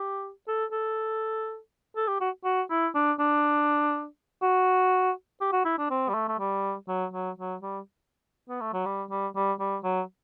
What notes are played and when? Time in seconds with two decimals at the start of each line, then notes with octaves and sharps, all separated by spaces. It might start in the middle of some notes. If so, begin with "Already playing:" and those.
Already playing: G4
0.48 A4
0.72 A4
1.96 A4
2.08 G4
2.21 F#4
2.44 F#4
2.70 E4
2.95 D4
3.19 D4
4.42 F#4
5.41 G4
5.52 F#4
5.65 E4
5.78 D4
5.90 C4
6.09 G3
6.14 A3
6.29 A3
6.39 G3
6.88 F#3
7.14 F#3
7.38 F#3
7.62 G3
8.49 B3
8.61 A3
8.74 F#3
8.86 G3
9.10 G3
9.35 G3
9.60 G3
9.84 F#3